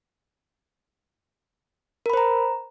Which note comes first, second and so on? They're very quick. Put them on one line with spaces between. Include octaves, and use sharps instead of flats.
A#4 B5 C5 A#5